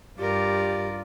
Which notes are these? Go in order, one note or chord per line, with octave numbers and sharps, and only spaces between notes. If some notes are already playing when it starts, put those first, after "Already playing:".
G2 F4 G4 A#4 D5